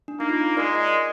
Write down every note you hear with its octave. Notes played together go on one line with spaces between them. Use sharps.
D4
A#3 D#4
F4
G#3 A#4 D5
D#5
D5